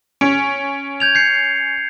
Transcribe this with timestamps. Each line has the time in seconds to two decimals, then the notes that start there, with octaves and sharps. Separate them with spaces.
0.21 C#4 D7
1.00 G6 G#6 F7
1.15 G6 C7 C#7